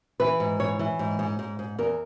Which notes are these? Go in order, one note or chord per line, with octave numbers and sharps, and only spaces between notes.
E3 B4
G#2
E3 C#5
E3
G#2
G#2
G#2
G#2
E2 A#4